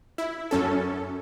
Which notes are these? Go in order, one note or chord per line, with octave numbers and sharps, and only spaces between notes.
E4
F#2 C#4 A4